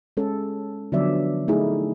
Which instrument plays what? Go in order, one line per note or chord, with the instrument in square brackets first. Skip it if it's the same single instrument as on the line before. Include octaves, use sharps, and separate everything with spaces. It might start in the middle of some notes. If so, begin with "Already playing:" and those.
[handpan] G#3 C#4 A4
D3 F3 F#3 B3 D5 E5
A3 D#4 E4 G#4